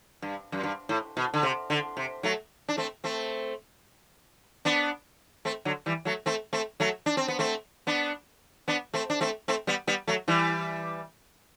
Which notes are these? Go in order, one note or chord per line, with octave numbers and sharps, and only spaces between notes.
G2
F#2
G2
A2
B2
D3
C3
D3
C3
F#3 A3
D4
A3 C4
A3 C4
B3 D4
A3 C4
D3 F#3
E3 G3
F#3 A3
A3 C4
A3 C4
F#3 A3
D4
C4
B3
A3 C4
B3 D4
B3 D4
A3 C4
D4
A3 C4
A3 C4
G3 B3
G3 B3
F#3 A3
E3 G3